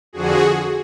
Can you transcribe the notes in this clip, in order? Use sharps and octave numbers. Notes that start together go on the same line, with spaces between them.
F2 D3 F3 F#4 G#4